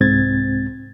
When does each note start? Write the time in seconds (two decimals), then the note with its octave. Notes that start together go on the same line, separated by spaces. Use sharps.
0.01 C2 G#2 C4 G#6 A6